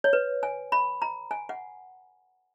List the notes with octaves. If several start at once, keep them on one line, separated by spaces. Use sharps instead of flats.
C#5
B4
G#5
B5
A#5
G#5
F#5